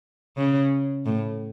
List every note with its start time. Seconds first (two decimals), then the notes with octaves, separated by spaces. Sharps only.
0.37 C#3
1.06 A2